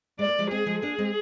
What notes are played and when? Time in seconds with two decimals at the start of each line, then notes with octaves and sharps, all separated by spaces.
0.19 G#3 D5
0.28 A#3
0.39 F3 G#3
0.50 G#3 C4 G#4
0.66 F3 G#3
0.82 A#3 D4 G#4
0.98 G#3 C4